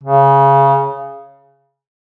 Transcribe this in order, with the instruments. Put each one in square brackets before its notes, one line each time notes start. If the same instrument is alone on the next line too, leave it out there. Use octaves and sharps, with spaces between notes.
[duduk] C#3